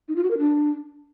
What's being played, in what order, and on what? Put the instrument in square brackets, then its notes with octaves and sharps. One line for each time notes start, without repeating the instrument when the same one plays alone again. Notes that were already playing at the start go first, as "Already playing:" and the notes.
[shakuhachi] D#4
F4
F#4
A#4
D4